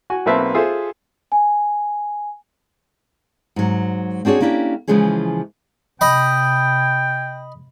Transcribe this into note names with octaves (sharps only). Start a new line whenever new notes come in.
F#4 G#5
B1 A#3 C4 B4 E5 A5
F4 G#4 A4 C5 E5
G#5
G#2 F#3
C4 D4 F#4 G#4 C#5
A#3 C#4 D4 E4 F4 G4
C#3 E3 F3 G#3 C#4 G#4
C3 D#5 G5 B5